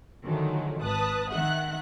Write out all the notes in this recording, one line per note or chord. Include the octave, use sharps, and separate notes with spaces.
D3 D#3 F3 F#3 G#3 A3
G#1 B4 A5 D#6 F#6
D#3 E5 F#5 F#6